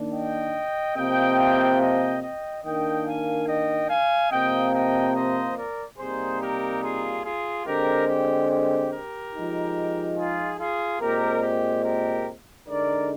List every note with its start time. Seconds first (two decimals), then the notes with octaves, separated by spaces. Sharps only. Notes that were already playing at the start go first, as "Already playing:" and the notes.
Already playing: D#3 A#3 D4
0.12 D#5 G5
0.96 C3 F3 A#3 D#5 G5
1.80 D#5 G5
2.22 D#5 G5
2.64 D#3 A#3 D4 D#5 G5
3.06 F5 G#5
3.47 D#5 G5
3.89 F5 G#5
4.31 C3 F3 A#3 D#5 G5
4.73 D#5 G5
5.15 C5 D#5
5.57 A#4 D5
5.98 C3 G3 A#3 D#4 G#4 C5
6.41 G4 A#4
6.82 F4 G#4
7.24 F4 G#4
7.66 D3 G#3 C4 G4 A#4
8.08 G4
8.50 G4
8.91 G4 A#4
9.33 F3 G#3 D#4
10.17 F4 G#4
10.59 F4 G#4
11.00 A#2 G#3 C4 G4 A#4
11.43 G4
11.84 G4 A#4
12.68 D3 G#3 D#4 A#4 D5